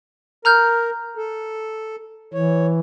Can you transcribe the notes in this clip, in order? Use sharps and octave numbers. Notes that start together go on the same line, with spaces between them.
A#4 A#5 F6 G6
A4
E3 C#5